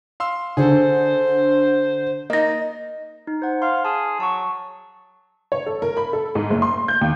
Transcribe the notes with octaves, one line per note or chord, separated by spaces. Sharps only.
F5 C6 E6
D3 G#4 A4 C5
A#3 D#4 D#5 A#6
D#4
C5 F#5
F5 C6
G#4 A5
F#3 A5 C#6
C#5
A4
A#4
B5
A4
G#2
F#1
C6
G6
D#2